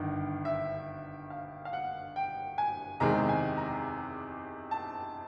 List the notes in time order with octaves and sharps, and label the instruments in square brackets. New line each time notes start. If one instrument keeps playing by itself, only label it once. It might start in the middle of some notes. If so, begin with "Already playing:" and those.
Already playing: [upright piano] G1 G2 D#3
E5
F5
F5
F#5
G5
G#5
E2 C3 D#3 G#3 A#5
G#5
A#5
A5